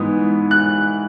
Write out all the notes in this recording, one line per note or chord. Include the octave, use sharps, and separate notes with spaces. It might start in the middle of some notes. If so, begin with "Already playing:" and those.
Already playing: G#2 E3 B3 D#6
F#6